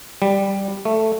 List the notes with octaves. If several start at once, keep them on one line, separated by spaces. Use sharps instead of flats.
G3
A3